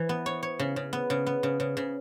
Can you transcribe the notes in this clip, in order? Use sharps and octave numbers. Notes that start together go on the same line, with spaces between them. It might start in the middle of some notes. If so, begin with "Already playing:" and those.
Already playing: E3
B3
C#5
C#5
C#3
C#3
B3
C#3
B3
C#3
C#3
C#3